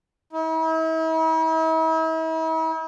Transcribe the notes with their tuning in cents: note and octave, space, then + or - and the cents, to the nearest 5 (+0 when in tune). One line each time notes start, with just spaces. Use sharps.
E4 -45